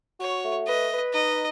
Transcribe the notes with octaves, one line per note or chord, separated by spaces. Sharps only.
F#4 C#5
A3
B4 D#5
B4
D#4 D#5